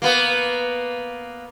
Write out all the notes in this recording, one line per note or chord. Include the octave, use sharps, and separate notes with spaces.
A#3 B3